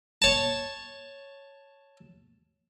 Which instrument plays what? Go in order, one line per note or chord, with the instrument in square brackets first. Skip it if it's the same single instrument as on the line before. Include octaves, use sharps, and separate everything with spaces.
[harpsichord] C#5 A5